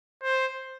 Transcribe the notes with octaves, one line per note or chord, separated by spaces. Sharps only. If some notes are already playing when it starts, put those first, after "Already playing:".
C5